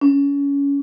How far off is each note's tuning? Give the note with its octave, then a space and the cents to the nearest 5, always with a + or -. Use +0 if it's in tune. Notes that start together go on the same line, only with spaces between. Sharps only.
C#4 +25